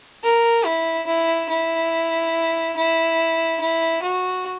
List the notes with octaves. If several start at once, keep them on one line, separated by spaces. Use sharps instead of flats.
A#4
E4
E4
E4
E4
E4
F#4